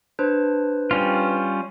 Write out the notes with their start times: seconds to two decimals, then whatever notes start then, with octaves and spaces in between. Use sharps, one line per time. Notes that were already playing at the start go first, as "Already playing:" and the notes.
0.19 D4 B4 C5
0.91 G3 C#4 F4